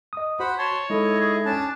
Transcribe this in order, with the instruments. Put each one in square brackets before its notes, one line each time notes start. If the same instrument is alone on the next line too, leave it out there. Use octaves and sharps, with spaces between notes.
[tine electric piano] D#5 D#6
[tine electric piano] F#4 [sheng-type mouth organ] C5 F#5 B5
[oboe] C#5 [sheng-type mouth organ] A5 C6
[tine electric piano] G#3 D#4 A4 [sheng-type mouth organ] E4 D#5
[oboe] G#4
[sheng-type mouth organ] C#4 A5 [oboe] D4